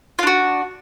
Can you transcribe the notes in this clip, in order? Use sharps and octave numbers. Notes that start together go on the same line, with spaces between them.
D4 F4 F#4